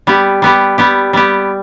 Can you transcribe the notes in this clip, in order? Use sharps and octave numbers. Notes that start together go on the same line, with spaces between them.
G3 B3 G4
G3 B3 G4
G3 B3 G4
G3 B3 G4